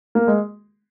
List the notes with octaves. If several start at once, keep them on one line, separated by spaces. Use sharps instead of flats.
A#3
G#3